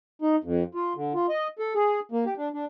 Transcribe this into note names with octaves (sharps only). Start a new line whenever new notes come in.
D#4
F2
F4
D3
F4
D#5
A4
G#4
A#3
G4
D4
D4